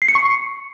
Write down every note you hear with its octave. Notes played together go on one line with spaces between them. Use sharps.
C7
C#7
C#6